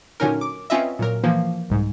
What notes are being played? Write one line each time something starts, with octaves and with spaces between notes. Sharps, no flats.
A#2 D3 F#3 C#4 D#4 A#4
D6
C4 C#4 F4 B4 D#5 E5
A#2 F#3 A#4
E3 F3 A#3
C2 G#2